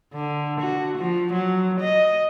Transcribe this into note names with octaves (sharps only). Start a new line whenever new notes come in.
D3
F#4
F3
F#3
D#5